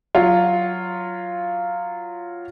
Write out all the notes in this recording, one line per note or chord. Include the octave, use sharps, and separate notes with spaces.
F#3 F4